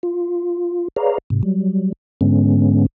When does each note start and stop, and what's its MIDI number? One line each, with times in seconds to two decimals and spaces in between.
0.03 0.88 65
0.96 1.18 68
0.96 1.18 71
0.96 1.18 73
0.96 1.18 74
0.96 1.18 77
0.96 1.18 82
1.30 1.42 44
1.30 1.42 48
1.43 1.93 54
1.43 1.93 55
2.21 2.86 44
2.21 2.86 50
2.21 2.86 56
2.21 2.86 59
2.21 2.86 61